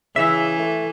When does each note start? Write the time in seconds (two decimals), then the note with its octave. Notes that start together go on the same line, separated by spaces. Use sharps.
0.16 C#3 E3 E5
0.59 A3